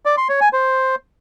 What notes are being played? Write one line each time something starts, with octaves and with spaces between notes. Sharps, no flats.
D5
C6
C#5
G#5
C5